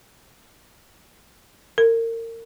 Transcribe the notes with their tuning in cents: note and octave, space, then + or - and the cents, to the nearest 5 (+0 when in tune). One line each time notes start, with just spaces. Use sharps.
A#4 -30